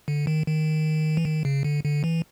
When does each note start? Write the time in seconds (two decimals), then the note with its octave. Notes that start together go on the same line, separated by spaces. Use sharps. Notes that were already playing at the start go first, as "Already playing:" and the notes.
0.08 D3
0.27 D#3
0.47 D#3
1.17 E3
1.25 D#3
1.45 C#3
1.64 D3
1.84 D3
2.04 E3